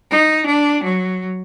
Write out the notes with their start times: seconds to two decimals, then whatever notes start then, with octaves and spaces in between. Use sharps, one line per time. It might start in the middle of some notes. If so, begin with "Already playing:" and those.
0.11 D#4
0.45 D4
0.83 F#3